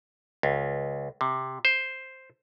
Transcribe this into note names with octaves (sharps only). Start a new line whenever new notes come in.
C#2
C3
C5